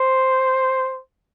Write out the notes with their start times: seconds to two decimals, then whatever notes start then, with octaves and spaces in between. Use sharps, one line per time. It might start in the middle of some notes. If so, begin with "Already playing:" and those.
Already playing: C5